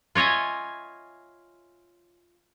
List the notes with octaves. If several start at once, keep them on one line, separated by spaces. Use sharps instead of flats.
F4 C#5 D#5 E5 G#5